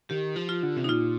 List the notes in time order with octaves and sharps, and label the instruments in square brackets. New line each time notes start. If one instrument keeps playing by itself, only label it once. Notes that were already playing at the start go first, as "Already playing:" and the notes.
[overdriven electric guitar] D#3 [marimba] G4
[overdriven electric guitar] F3
[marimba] F4
[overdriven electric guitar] D3
C3
[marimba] D#4
[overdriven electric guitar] A#2 [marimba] F4